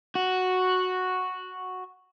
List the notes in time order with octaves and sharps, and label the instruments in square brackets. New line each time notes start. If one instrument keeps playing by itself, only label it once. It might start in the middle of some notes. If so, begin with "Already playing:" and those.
[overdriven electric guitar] F#4